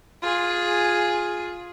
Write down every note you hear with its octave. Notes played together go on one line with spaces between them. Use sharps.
F4 G#4